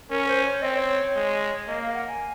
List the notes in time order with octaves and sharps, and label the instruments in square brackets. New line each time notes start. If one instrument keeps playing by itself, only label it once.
[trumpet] C#4 [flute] A#4
[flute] C5
C#5
[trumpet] C4 [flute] C#5 D#5
[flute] C5
C#5
[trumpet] G#3
[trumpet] A#3 [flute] D#5
[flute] F5
F#5
G#5